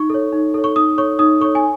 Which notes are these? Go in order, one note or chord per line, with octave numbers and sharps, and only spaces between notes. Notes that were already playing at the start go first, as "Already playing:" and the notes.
Already playing: D#4 C#6
A4 C#5
D#4
A4 C#5
C#6
D#4 D#6
A4 C#5 C#6
D#4 D#6
A4 C#5 C#6
G#5